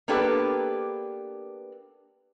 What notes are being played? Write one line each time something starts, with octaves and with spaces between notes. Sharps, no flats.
A#3 B3 D4 G4 A4 B4